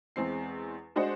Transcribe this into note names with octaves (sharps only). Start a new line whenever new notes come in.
E2 G#3 C4 C7
G#3 D4 F#4 C5 D#5 F#5